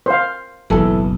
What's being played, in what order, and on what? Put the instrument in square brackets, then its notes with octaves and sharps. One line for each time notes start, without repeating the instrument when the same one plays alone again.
[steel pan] C5 F5
[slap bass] F#1 B1 [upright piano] E3 A4